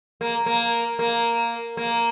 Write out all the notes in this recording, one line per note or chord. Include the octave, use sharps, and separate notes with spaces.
A#3
A#3
A#3
A#3